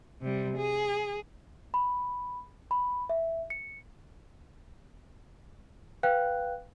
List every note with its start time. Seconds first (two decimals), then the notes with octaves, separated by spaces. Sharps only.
0.21 C3 G3
0.57 G#4
1.74 B5
2.71 B5
3.10 E5
3.50 C#7
6.03 B4 F5 G5 F#6